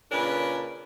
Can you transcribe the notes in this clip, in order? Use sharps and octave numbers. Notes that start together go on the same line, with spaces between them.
A#2 C#3 C#4 D4 A#4 B4